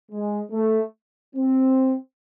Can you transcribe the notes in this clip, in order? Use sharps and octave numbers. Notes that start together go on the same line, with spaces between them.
G#3
A3
C4